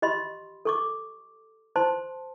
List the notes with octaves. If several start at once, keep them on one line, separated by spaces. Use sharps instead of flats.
G4 D#5 B5 C6
A4 C#6 D6
C5 A5 C6